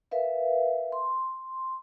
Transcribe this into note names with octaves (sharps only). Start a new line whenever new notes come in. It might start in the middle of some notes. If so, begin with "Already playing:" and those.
A#4 B4 E5 F5
C6